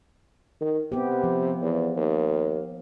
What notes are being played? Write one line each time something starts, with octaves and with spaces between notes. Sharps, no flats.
D#3
C3 B3 G4
F3
E2
D#2